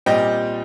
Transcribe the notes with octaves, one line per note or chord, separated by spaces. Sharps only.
A#2 G3 C4 D#5 G5